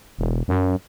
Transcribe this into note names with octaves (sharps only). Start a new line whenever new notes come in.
E1
F#2